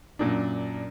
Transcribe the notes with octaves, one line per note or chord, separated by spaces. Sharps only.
F#2 A#2 D4